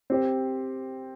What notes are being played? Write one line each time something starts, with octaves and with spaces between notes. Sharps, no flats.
C4 G4 C5